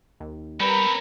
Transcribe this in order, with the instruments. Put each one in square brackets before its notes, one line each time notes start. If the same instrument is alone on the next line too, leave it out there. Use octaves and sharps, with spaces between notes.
[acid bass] D#2
[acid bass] G3 [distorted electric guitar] C4 C#4 [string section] A#4 B4 A#5 [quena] B5